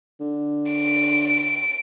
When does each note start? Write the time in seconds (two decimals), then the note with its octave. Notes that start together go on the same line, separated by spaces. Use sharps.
0.20 D3
0.72 D7